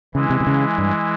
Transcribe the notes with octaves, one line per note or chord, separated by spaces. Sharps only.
C#3 E3 G#3 E4
C3
C3
C#3
G2